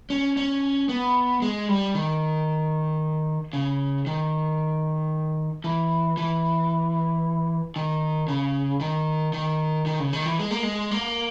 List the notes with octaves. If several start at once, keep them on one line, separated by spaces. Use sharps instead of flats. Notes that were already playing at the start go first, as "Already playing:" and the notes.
C#4
C#4
B3
G#3
G3
D#3
C#3
D#3
E3
E3
D#3
C#3
D#3
D#3
D#3
C#3
D#3
E3
G#3
A#3
G#3
A#3